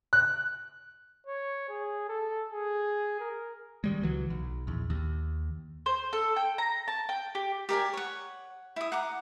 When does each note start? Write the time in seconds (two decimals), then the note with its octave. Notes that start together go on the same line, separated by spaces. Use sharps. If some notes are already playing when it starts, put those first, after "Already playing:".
0.13 F#6
1.27 C#5
1.69 G#4
2.09 A4
2.52 G#4
3.20 A#4
3.84 D#3 G3 G#3
4.02 C#2 E3 F#3
4.30 B1
4.67 A#1 E2
4.90 D#2
5.86 C5
6.13 A4
6.36 G5
6.58 A#5
6.88 A5
7.09 G5
7.35 G4
7.69 G4 A#4 D5 G#5
7.93 C#5 F#5
8.76 E4 D#6
8.92 F#5 A#5 D6